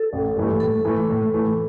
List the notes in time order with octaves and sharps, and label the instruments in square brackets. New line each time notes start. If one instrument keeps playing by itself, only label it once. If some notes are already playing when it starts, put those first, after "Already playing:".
Already playing: [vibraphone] A4
[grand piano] A1
G2 E3 A3
[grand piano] A2 [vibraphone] A4
[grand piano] E3 A3
A2
E3 A3